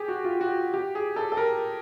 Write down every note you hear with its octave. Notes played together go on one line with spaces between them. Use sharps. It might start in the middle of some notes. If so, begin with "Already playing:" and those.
Already playing: G4 G#4
F#4
F4
F#4
G4
G#4
A4
A4
A#4